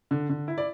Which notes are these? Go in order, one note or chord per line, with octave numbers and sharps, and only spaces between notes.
D3
D3
E4
D5